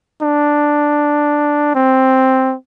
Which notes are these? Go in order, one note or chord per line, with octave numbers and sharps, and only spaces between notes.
D4
C4